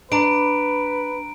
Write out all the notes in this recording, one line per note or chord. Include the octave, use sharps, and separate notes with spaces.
D4 B4 A#5 D7